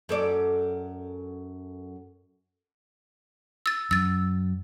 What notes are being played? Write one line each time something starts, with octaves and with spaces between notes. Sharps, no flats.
F#2 A4 D5
E6 A6
F#2 E6 A6